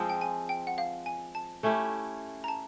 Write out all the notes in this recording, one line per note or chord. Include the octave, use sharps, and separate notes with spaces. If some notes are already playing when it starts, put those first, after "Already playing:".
Already playing: F3 G#3 C4
G5
G#5
G5
F#5
F5
G#5
A5
A3 C#4 E4 G4
A#5
A5